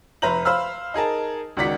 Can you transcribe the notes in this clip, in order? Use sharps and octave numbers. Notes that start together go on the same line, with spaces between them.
F1 B4 E5 A#5 G6 F#7
C5 F5 B5 E6 F6
D#4 G#4 A#4 A5
C#2 D#3 F#4 D5 F#5 B6